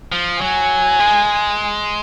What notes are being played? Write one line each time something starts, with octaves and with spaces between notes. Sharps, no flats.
F3
F#3 G#5
G#3